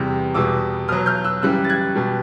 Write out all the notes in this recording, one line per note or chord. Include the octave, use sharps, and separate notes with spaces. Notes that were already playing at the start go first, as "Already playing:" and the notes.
Already playing: E2 C3 E3 G3
E2 B2 G3 D6 E6
B2 F#3 D#6 F6
F6 G6
E6 F#6
F#2 C#3 E3 G3 E6 F#6
A6
F#6 G#6
B2 G3